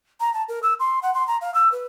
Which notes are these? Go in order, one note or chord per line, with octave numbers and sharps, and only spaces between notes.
A#5
A5
A#4
E6
C6
F#5
C6
A#5
F5
E6
B4